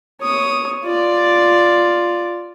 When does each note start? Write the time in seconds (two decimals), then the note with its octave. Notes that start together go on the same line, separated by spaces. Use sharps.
0.20 C#5 D#6
0.84 F4 D5